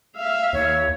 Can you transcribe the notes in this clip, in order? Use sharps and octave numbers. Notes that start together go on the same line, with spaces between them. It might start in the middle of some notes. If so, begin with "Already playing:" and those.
E5 F5
D#2 C#5